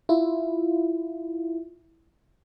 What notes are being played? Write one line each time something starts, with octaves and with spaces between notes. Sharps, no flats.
E4 F4